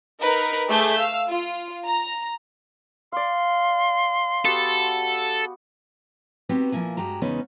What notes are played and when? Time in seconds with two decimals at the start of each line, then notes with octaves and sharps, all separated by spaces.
0.21 D#4 A#4 B4
0.67 A3 G#4 D6 G6
0.96 F5 E6
1.28 F4
1.84 A#5
3.12 D5 F5 C6
4.45 B3 F#4 G4 A4
6.49 B3 C4 D#4 F#4 G4 B4
6.72 A#2 F3 A#3 E4 G#5
6.97 G2 G#3 F#4 G4 A#5
7.21 E2 C#3 G#3 B3 C#4 D#4